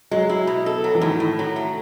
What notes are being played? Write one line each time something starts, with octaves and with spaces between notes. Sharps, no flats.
F#3 G#3
E4
B2
A4
F#3
E3
A2 D#3
A2
F#3
A3